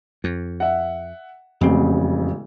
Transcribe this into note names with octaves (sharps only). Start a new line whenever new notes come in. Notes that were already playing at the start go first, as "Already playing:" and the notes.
F2
E5 F#5
E1 A1 F2 C#3 C4